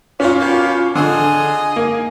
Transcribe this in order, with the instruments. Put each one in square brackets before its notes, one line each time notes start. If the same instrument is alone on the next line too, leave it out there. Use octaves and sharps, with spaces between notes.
[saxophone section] A#2 [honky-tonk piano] C#4 F4
[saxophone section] B2 A#3 G4
[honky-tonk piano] D3 [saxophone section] G#4 D#5
[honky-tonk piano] A#3